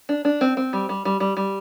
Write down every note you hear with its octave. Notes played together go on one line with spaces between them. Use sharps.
D4
D4
C4
C4
G3
G3
G3
G3
G3